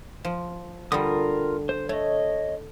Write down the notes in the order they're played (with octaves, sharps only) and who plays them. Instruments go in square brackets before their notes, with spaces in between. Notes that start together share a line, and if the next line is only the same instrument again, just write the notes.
[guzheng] F3
[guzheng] D3 G3 [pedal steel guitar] F4 A#4 D#6
[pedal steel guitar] C5
[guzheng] A3 [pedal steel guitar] C#5 D#5